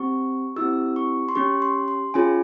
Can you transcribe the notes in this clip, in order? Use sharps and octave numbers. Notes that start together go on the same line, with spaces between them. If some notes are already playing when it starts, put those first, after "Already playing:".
Already playing: C4 G4 C#6
C4 E4 G4 E6
C#6
C6
C#4 G4 C#6
C6
C6
C#4 F4 G#4 G#5